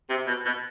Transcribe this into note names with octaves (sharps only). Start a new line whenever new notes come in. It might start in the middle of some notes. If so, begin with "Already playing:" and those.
C3
B2
B2